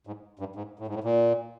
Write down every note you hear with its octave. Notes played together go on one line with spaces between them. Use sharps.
G#2
G2
G#2
A2
G#2
A2
A#2